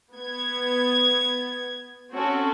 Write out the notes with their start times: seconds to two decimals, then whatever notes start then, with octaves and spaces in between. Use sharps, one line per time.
0.13 B3 G#6
2.14 C4 C#4 F#4 A4